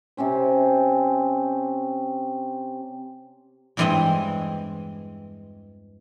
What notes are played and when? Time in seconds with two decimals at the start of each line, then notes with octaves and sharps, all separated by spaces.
0.17 C3 C4 C#4 C5
3.77 E2 G2 E3 G#3 C4 D#5